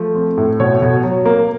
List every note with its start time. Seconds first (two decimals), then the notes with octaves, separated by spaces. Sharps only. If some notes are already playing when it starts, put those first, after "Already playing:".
Already playing: F3 A3
0.15 C4
0.37 A2
0.60 B2 C#5
0.82 B2
1.03 F#3
1.25 A#3